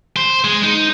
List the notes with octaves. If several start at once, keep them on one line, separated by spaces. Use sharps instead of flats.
C5
G#3
D#4